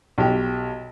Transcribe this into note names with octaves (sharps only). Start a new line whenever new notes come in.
B1 G4